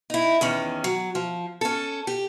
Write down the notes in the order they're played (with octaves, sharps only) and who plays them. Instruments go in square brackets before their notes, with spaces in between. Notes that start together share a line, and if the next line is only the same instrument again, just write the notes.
[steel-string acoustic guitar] D#4 E4
E2 D#3 C#4
F#3
F3
C#4 A4
G4